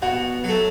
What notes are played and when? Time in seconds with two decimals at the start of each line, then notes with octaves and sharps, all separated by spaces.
0.02 B2 F#4
0.44 F#3 A3